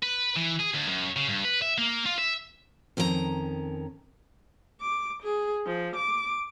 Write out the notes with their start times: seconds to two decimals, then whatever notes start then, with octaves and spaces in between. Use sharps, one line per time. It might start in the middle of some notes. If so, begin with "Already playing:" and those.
0.03 B4
0.37 E3
0.60 G#4
0.75 D2
0.88 F#2
1.16 C#3
1.29 G2
1.45 B4
1.62 E5
1.78 A#3
2.06 F4
2.18 E5
2.97 F2 D#3 C#4 E4 A#5
4.81 D6
5.23 G#4
5.67 F3
5.96 D6